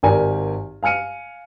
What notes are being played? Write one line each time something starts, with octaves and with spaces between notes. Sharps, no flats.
G#1 G4 A#4 D5 G#5
F5 G#5 F6 C#7 D#7